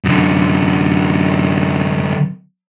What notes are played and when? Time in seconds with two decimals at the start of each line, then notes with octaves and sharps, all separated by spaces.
0.04 F#2 D3